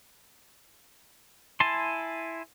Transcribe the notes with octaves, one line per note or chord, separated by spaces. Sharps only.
E4 G#5 A5 C6